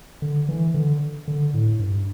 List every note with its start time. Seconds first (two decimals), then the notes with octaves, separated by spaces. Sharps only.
0.22 D3
0.49 E3
0.74 D3
1.28 D3
1.54 A2
1.80 G2